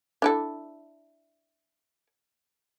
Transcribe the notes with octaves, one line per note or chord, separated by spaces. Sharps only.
D4 E4 A4